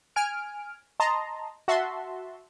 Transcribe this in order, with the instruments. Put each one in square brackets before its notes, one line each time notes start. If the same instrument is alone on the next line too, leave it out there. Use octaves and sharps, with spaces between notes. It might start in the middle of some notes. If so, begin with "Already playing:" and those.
[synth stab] G#5 F6 D7
D#5 A5 A#5 C6
F#4 E5 A5 C6